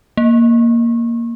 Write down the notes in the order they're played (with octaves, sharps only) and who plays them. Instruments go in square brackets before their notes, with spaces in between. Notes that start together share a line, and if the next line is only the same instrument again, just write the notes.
[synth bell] A#3